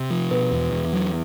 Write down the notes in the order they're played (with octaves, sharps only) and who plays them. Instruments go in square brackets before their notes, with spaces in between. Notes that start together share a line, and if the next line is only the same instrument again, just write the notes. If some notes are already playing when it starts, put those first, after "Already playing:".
Already playing: [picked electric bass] C3
F3
[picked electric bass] B2 [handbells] B4
[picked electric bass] E2
E2
F#3